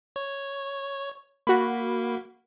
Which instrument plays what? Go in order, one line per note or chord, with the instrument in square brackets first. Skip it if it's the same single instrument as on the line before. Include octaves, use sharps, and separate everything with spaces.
[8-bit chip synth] C#5
[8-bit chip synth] A#3 [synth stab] F#4 B5